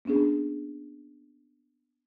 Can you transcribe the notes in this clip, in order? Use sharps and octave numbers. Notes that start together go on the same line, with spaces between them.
A#3 B3 C#4 D4 G#4